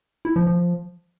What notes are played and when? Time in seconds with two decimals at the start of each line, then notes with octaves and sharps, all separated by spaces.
0.25 E4
0.36 F3
0.47 F3